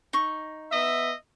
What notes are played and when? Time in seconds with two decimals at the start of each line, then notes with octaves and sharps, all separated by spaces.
0.13 D#4 C#6
0.72 B3 D#5 E5